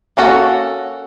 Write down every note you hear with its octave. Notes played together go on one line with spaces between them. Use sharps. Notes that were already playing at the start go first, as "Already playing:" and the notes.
A#3 C#4 F#4 A4